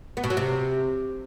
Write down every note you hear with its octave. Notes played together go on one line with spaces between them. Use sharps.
B3
B2
F#3
C3